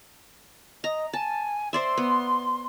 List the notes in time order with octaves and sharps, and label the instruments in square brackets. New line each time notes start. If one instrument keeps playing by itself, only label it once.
[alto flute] D#5 [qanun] A#5
[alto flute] G#5 [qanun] A5
[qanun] C5 D5 E5 [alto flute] C6
[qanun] B3